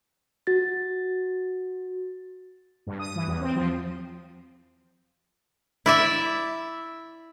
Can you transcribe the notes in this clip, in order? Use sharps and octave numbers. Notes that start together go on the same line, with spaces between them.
F#4 A6
G2
D#6
E3
E2
C4
F3
E4 D5 E5